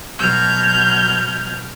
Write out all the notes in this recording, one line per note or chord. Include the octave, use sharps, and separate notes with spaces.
B2 F#3 F6 G6 G#6